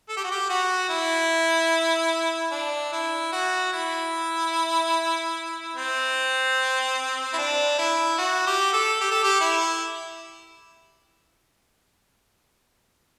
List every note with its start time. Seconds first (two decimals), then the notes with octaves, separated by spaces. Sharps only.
0.09 A4
0.17 G4
0.24 F#4
0.31 G4
0.50 F#4
0.89 E4
2.52 D4
2.93 E4
3.33 F#4
3.73 E4
5.76 C4
7.34 E4
7.38 D4
7.79 E4
8.18 F#4
8.47 G4
8.73 A4
9.01 G4
9.11 A4
9.23 G4
9.41 E4